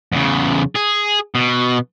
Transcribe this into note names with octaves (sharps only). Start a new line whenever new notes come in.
E2 C#3
G#4
B2